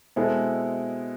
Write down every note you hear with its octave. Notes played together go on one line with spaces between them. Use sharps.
B2 G#3 C4 E4 A4